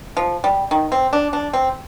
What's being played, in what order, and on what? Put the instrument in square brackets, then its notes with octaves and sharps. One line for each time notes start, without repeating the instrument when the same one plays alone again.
[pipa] F3
G3
D#3
C4
D4
D4
C4